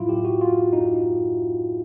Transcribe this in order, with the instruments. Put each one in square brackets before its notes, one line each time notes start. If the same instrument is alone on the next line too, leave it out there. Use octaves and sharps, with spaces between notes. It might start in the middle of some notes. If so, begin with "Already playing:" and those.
Already playing: [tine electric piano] A2 F#3 E4 F4
G4
F#4
F4
D#4